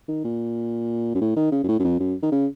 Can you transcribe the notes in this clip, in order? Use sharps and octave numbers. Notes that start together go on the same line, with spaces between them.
D#3
A#2
F#2
A2
D#3
C#3
F#2
A2
F#2
F2
F#2
D#3
C#3